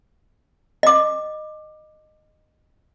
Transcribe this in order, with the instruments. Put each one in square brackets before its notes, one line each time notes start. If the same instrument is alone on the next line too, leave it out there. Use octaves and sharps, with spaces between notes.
[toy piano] D#5 D6